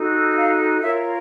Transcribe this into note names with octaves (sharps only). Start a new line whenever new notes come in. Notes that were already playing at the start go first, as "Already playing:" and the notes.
Already playing: D#4 F#4 A4
F5
F4 A#4 C#5 E5